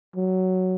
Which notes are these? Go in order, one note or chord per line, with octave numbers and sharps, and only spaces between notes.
F#3